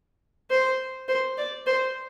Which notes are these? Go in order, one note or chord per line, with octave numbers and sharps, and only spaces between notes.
C5
C5
D5
C5